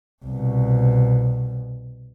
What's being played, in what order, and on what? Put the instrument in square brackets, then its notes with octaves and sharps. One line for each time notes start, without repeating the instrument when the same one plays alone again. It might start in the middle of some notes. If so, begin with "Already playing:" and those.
[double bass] C2 B2